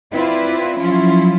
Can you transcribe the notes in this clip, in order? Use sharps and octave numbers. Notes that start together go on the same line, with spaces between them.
C4 E4 F4 B4 D5
F3 F#3 C#4 E4 F4